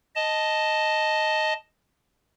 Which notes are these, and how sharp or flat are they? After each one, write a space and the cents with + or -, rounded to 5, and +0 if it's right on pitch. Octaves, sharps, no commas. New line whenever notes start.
D#5 +0 A5 +0